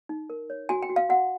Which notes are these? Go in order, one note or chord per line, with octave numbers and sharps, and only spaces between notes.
D#4
A#4
C#5
F#4 G#5
G5
F#4
F5
F#4 F#5